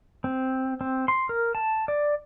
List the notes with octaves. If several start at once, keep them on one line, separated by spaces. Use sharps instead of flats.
C4
C4
C6
A#4
A5
D5